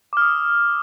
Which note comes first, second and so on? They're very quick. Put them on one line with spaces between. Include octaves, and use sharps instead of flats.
D6 F6 D#6